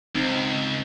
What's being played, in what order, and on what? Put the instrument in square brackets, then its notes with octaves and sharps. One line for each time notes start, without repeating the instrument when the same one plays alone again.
[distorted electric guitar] C#2 [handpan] C4 D#4